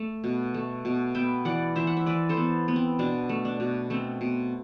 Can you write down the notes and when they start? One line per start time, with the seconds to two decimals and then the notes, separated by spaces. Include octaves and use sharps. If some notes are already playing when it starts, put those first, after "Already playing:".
Already playing: A3
0.24 B2
0.54 A3
0.85 B2
1.15 B3 E5 G5
1.45 E3 D5 F#5
1.76 E3 C5 E5
1.87 F#5
1.97 E5
2.06 E3 B4 D5
2.29 A4 C5
2.37 B3
2.68 B3
2.76 C4
2.99 B2 D4
3.29 A3
3.45 D4
3.60 B2
3.90 A3 C4
4.21 B2